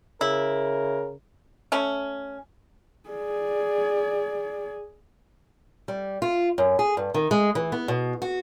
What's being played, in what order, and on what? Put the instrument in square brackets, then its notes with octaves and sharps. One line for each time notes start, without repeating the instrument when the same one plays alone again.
[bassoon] C#3 [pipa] E4 [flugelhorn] A#4
[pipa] A3 C#4
[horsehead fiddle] G#4 D5
[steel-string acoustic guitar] G3
F4
F#2
G#4
G2
D#3
G#3
E3
B3
B2
F#4